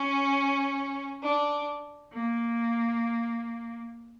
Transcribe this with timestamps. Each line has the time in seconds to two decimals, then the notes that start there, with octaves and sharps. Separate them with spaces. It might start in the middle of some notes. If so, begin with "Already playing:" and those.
Already playing: C#4
1.22 D4
2.13 A#3